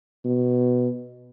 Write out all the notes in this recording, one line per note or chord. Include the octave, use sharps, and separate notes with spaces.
B2